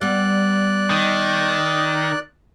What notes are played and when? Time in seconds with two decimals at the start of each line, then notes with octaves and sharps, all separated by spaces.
0.01 G3 B3 D5 F#6
0.90 D#3